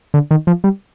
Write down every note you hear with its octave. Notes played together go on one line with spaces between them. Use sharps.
D3
D#3
F3
G3